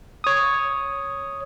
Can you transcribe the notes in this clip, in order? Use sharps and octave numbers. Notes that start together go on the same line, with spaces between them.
C#5 D#6